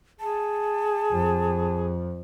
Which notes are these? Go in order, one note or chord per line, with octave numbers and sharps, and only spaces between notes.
G#4 A5
F2